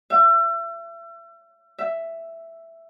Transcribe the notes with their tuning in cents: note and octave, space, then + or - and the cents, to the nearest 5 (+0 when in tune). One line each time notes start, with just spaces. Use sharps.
E5 +35
E5 +5